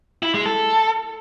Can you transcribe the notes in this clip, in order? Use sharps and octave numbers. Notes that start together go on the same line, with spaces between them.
E4
G#3
A4